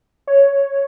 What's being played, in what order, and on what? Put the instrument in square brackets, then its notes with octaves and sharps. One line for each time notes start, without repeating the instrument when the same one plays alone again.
[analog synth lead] C#5